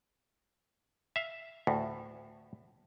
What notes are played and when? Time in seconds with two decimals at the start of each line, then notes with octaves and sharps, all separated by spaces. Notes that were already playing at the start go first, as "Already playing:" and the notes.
1.16 E5 F5
1.67 D2 A2